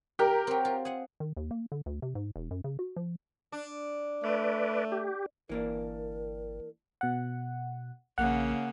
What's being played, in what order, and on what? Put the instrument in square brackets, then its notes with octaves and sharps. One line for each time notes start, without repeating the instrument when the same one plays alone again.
[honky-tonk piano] G4 A#4 [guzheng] G5
[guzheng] F#3 C4
F4
G#4 F#5
[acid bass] D#3
D#2
A#3
D3
D2
C3
G#2
E1
F#2
C#3
F#4
F3
[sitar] D4
[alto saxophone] A3 [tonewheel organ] B4 D5
[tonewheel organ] G4
[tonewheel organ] G1 [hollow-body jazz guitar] E3 A#3 D4 [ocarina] A#4
[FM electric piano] B2 F#5
[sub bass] A#1 [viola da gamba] C#3 A#3 [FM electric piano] F#5